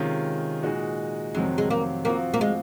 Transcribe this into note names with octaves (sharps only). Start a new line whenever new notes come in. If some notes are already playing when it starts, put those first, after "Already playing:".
Already playing: C3 D#3 G#3 C#4 F4
A#2 G#3 D#4 F#4
F2 C3 D#3 F#3 G#3 C4
G#3
A#3
F3 A#3 C4 F#4
A#3
G#3